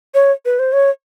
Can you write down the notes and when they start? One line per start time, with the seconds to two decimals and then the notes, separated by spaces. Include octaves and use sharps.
0.14 C#5
0.45 B4
0.59 C5
0.73 C#5